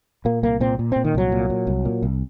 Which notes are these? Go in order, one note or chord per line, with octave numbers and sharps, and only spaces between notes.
A#2 A#3
C2 A#3
A#2 C4
A#2
A#2 C4
D#3
C2 F#3
A#2
A#2
C2
A#2
C2